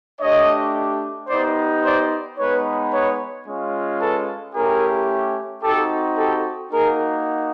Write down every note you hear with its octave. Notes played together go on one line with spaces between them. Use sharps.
A3 D4 G4 C#5 D#5
B3 D#4 G4 C5 D5
C5 D5
G#3 B3 D#4 B4 C#5
B4 C#5
G#3 C#4 F4
A4 B4
A3 C#4 E4 G4 G#4 A#4
C4 D#4 F#4 G4 A4
G4 A4
A#3 D#4 F#4 G#4 A#4